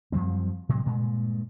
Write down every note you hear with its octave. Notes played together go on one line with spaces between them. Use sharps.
F#2 F3 G3 C4
A2 C3 F#3 G#3
G2 A#2 G#3